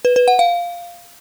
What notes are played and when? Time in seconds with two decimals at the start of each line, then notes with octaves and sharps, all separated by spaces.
0.05 B4
0.16 B4
0.28 F#5
0.39 F5